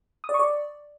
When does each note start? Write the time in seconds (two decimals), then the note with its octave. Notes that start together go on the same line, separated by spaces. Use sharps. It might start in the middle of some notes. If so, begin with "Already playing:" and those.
0.24 D#6
0.29 D5
0.34 C#6
0.39 D5